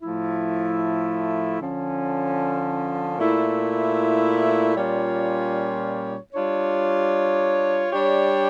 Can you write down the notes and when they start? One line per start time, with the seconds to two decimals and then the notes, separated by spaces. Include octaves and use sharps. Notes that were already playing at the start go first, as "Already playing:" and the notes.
0.02 A2 F3 A3 E4
1.60 D3 F3 C#4
3.18 A#2 A3 E4
4.75 A#2 G3 C#4 F4 C#5
6.33 G3 D4 F4 C#5
7.92 G3 D4 G4 C#5